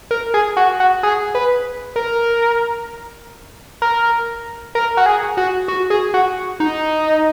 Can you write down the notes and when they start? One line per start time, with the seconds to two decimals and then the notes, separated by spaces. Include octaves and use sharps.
0.11 A#4
0.34 G#4
0.57 F#4
0.80 F#4
1.03 G#4
1.35 B4
1.96 A#4
3.82 A#4
4.75 A#4
4.97 F#4
5.06 G#4
5.37 F#4
5.68 F#4
5.90 G#4
6.14 F#4
6.60 D#4